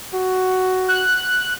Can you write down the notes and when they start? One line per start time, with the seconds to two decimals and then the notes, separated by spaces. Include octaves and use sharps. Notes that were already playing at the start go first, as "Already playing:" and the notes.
0.14 F#4
0.88 F#6